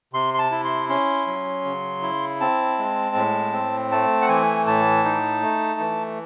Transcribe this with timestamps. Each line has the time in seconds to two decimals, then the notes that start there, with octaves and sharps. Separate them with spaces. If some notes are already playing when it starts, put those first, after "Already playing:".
0.13 C3 C6
0.34 C6
0.39 A5
0.51 E4
0.64 C6
0.89 C#4 C6
1.27 F#3
1.65 C#3
2.02 E4
2.41 C4 A5
2.79 G#3
3.16 A2
3.53 C4
3.92 A3 A5
4.21 F#5
4.28 E3 G#5
4.67 A2 A5
5.05 D#4
5.42 A3
5.80 E3